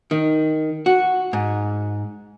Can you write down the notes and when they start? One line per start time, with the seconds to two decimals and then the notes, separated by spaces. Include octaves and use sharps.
0.11 D#3
0.86 F#4
1.33 G#2